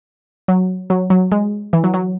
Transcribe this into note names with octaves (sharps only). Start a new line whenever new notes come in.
F#3
F#3
F#3
G#3
E3
F#3
F#3